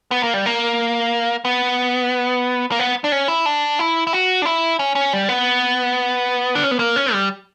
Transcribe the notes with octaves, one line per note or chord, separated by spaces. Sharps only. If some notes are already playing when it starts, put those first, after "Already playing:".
B3
A#3
G3
A#3
B3
A#3
B3
D4
C#4
E4
D4
E4
E4
F#4
D4
E4
C#4
C#4
G3
B3
D4
C#4
B3
A#3
C#4
G3